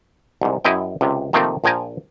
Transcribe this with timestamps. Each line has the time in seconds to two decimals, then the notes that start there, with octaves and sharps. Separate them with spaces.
0.41 C2 G#2
0.65 F#2 E4 D#5 G5
1.01 C#2 C3
1.33 C3 D#3 F3 A3 A#3 C4
1.64 A#1 F3 G5 G#5 A#5